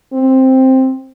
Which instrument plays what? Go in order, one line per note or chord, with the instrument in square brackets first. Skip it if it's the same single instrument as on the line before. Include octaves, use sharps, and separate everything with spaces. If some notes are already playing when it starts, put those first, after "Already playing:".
[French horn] C4